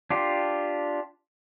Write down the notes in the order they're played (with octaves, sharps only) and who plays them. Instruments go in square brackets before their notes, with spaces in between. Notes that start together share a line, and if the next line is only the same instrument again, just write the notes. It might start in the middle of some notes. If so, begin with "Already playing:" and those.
[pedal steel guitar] D4 F4 G4